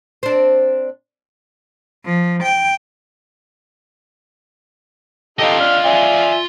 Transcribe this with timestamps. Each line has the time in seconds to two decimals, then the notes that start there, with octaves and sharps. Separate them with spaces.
0.23 C4 D4
2.05 F3
2.43 G5
5.39 D#4 F4 G4 A4 D#5
5.60 D4 F6
5.85 D5 E5 G#5